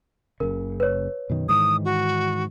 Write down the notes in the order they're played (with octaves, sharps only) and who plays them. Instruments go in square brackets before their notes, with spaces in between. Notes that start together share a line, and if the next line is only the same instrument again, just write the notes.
[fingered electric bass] F#1 C#3 [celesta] A#4
[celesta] B4 C#5
[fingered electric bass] F#2 B2 D#3
[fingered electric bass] G#2 D#3 E3 [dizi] D#6
[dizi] F#4